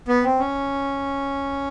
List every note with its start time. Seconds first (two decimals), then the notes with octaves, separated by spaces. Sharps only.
0.08 B3
0.24 C4
0.39 C#4